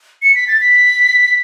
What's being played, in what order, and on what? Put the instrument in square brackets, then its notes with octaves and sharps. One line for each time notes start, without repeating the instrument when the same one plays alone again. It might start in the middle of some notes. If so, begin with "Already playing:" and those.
[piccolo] C#7
B6
A6
B6